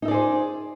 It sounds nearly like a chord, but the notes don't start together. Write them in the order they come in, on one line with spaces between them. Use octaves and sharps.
D#4 E5 D5 G#4 C5